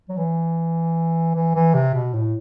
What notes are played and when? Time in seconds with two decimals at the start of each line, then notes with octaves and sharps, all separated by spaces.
0.09 F#3
0.17 E3
1.35 E3
1.55 E3
1.74 C3
1.94 B2
2.13 A2